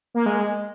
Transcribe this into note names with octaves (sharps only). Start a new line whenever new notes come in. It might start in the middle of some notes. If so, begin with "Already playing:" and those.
A#3
G#3